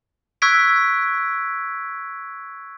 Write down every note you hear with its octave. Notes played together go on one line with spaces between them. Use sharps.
C#6 E6 F#6 G#6 B6 D7